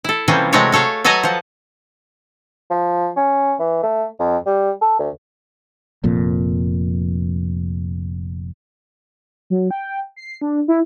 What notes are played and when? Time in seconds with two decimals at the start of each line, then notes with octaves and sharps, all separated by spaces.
0.04 E4 A4
0.28 C3 E3 F3 G3 A#3 C#4
0.53 C3 F#3 G#3 A3 C#5 F#5
0.72 A3 A4 C#5 F5
1.04 F#3 A4 B4 D#5 G#5 A#5
1.23 F3 F#5
2.70 F3
3.17 C#4
3.59 E3
3.83 A3
4.19 F2
4.46 G3
4.81 A4
4.99 D2
6.04 F1 F2 A#2
9.50 F#3
9.71 G5
10.16 C7
10.41 D4
10.68 E4